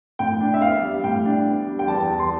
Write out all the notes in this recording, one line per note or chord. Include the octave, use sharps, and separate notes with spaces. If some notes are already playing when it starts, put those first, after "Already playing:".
A2 G5
D4
E5
B3 F5
G3
A2 G5
D4
B3
G3
G5
E2 A5
E2
C6